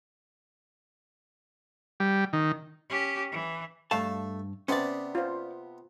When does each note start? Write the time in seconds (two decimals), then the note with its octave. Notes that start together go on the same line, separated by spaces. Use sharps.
2.00 G3
2.33 D#3
2.89 C#4 G4
3.32 E3
3.91 G2 A3 F5 A5
4.68 C3 B3 C#4 D5 C6
5.15 F4 C5